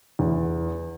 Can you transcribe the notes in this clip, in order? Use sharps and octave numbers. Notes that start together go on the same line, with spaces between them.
E2